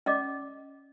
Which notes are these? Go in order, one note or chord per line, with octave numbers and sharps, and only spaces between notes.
C#4 D5 D#5 D6